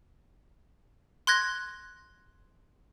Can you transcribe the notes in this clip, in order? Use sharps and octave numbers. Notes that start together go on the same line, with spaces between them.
C6 F#6 G#6 A#6